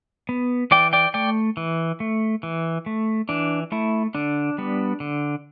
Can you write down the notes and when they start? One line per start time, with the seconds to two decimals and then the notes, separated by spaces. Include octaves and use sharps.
0.29 B3
0.71 E3 D5 G5
0.93 D5 G5
1.14 A3 D5 G5
1.57 E3
2.00 A3
2.43 E3
2.86 A3
3.29 E3 D4
3.72 A3 E4
4.15 D3 D4
4.58 G3 B3
5.00 D3